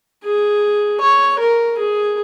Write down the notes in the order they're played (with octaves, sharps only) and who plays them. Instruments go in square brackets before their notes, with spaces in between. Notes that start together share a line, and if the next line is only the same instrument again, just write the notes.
[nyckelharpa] G#4
C#5
A#4
G#4